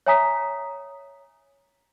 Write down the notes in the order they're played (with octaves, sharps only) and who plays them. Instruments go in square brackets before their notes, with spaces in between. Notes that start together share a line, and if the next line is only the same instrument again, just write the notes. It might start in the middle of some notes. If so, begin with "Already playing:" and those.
[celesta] C#5 E5 G#5 A#5 D#6 B6